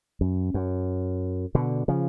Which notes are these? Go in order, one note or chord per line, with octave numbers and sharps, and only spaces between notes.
F#2
F#2
B2 D3
C#3 F3